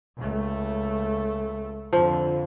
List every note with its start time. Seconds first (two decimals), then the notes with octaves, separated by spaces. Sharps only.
0.17 C#2 A3
1.93 F2 D3 F3